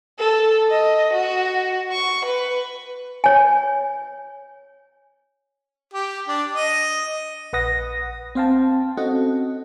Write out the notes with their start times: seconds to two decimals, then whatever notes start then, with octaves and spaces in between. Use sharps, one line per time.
0.19 A4
0.69 D#5
1.13 F#4
1.92 C#6
2.25 B4
3.24 C#5 G#5
5.94 G4
6.28 D4
6.53 D#5
7.53 A#1 B4 F#5 D#6 A#6
8.35 C4 C5 F5 G5 A5
8.97 C4 C#4 F#4 A4 D#5 F#5